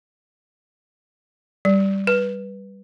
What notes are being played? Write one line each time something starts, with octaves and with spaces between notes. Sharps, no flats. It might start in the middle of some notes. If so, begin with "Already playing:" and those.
G3
B4